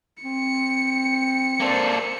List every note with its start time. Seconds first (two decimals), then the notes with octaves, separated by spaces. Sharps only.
0.24 C4 C#7
1.60 A#3 A4 C5 D5